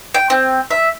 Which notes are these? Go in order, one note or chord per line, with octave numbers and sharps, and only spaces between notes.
G5
C4
E5